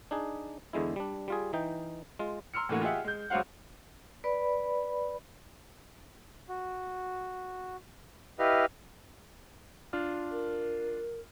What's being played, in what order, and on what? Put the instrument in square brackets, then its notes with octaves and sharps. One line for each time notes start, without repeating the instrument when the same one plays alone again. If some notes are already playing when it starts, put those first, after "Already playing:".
[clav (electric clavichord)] D4 D#4 G#4
E2 D3 G#3 E4
G3 D4
G3 F4 G#4
E3 D#4 G5
G#3 F4
[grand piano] A#5 C6 E6 F6 C#7
A2 D3 E3 A3 A#3 F#4
F4 G4 G#4 D#5 E5 F#5
G#3 G6
C#2 F#3 F#4 C5 F5 F#5
[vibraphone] B4 D5 B5
[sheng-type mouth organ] F#4
E4 G4 B4 D#5 F5 F6
[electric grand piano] D4 F4 F6
[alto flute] A#4